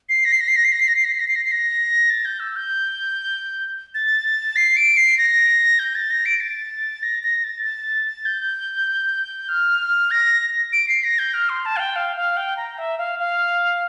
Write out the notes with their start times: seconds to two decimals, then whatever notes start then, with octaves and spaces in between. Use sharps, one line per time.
0.09 C7
0.25 A#6
0.32 C7
0.40 A#6
0.48 C7
0.56 A#6
0.65 C7
0.72 A#6
0.80 C7
0.88 A#6
0.96 C7
1.04 A#6
1.12 C7
1.19 A#6
1.28 C7
1.36 A#6
1.44 C7
1.52 A#6
2.10 A6
2.25 G6
2.40 E6
2.56 G6
3.95 A6
4.56 C7
4.77 D7
4.97 C7
5.18 A#6
5.79 G6
5.95 A6
6.10 A#6
6.26 D7
6.40 A6
7.03 A#6
7.23 A#6
7.44 A6
7.64 A6
8.26 G6
9.49 F6
10.11 A#6
10.73 D7
10.88 C7
11.04 A#6
11.19 G6
11.34 F6
11.49 C6
11.65 A5
11.77 F5
11.80 G5
11.96 F5
12.16 F5
12.37 G5
12.57 A#5
12.78 E5
12.98 F5
13.19 F5